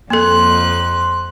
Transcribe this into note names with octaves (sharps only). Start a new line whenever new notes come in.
F2 A#3 A4 C6 F#6